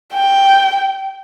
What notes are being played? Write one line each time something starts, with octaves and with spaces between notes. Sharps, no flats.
G5